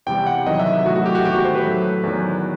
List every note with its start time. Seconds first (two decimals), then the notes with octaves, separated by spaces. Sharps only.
0.06 E2 C3 E3 G3 G5
0.27 F#5
0.46 E2 C3 D#3 F#3 D#5
0.59 E5
0.73 E5
0.86 A2 F#3 A3 F#4
0.96 F#4
1.06 G4
1.15 F#4
1.25 E2 D#3 A3 G4
1.35 F#4
1.45 C5
1.55 B4
1.65 A2 F#3 A3
2.04 E2 D#3 F#3